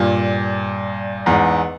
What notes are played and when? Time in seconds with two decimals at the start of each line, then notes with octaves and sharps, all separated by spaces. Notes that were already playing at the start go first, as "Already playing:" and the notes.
Already playing: G2 A#2
1.26 E2 G#2